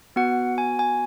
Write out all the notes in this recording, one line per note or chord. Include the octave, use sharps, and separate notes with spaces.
B3 F#4 F#5
G#5
G#5